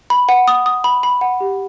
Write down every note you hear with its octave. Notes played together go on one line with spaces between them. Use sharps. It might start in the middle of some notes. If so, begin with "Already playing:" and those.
B5
F#5
D#6
D#6
B5
B5
F#5
G4